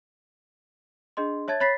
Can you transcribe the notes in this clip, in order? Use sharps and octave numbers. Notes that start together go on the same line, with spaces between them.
D4 G#4 D#5 C6
C#5 E5 A5 G#6 A6
C#5 B5 A6 B6 C7